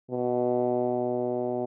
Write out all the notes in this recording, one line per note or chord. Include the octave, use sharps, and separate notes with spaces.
B2